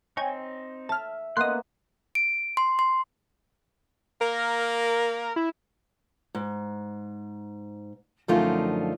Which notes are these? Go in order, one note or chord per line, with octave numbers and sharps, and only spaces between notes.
C4 D#4 C#5 G5 G#5
E5 A5 F6
A#3 B3 C#4 D#5 C6 F#6
D7
C6
C6
A#3 A#4
E4
G#2
F#2 D3 F3 A3 D#4 F4